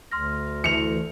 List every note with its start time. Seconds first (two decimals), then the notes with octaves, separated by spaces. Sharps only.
0.11 D2 C6 F6 A#6
0.64 E3 A3 C#7 F7